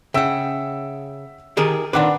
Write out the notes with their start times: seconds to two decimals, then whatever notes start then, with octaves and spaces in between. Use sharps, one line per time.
0.14 C#3 E5 F#5 G5 E6
1.57 D#3 G4 G#4 A#4
1.93 A#2 D#3 C4 D4 B4 F#5 D6